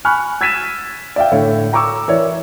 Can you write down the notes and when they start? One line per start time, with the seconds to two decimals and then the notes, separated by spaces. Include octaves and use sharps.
0.05 G#5 B5 C#6 F6 F#6
0.41 E6 G#6 A6 B6 D#7 E7
1.16 D5 E5 F5 G5
1.32 A2 D3 C#5
1.72 G5 A#5 C#6 D6 E6
2.08 E3 E4 A#4 C#5 D5